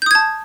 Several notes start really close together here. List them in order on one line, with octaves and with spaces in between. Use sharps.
G6 D#6 G#6 A5